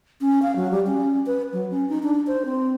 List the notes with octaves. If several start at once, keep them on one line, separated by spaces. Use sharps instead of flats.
C#4
F5
F#3
G3
C#4
B4
F#3
C#4
D#4
D4
C5
C4